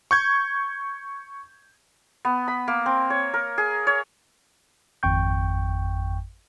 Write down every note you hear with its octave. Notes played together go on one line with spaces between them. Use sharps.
C#6 G6 G#6
B3
B5
A#3
C4
C#5
A#4
G#4
C#5
G#1 F2 G5 C#6 G6